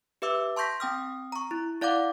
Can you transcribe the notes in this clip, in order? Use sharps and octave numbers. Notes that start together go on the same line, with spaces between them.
G4 B4 E5 D6 E6
A5 C6 C#6 G6 A#6 B6
C4 G5 D#6 F6
A#5 C#6
E4
E4 D5 F5 F#5 D6